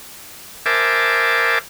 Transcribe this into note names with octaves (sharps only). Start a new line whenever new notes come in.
A#4 C5 E5 G#5 A5 D6